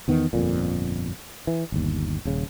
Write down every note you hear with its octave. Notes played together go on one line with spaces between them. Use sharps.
E2 D#3 B3
G1 F2 A#2
E3
G1 D#2
D#1 C#3